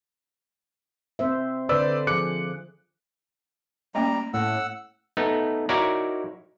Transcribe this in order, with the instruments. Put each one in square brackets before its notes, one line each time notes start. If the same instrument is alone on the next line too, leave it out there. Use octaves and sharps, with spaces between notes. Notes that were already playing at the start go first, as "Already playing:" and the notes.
[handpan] C4 C5 E5
[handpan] D3 C5 [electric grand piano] B4 D5 E6
[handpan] F3 G#4 [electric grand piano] D6 F#6 C#7
[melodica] G3 A#5 [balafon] A3 A#3 C#4
[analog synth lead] A2 [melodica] F#5 E6
[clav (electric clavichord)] A3 B3 D#4
D#4 E4 F#4 A#4 C#5 D5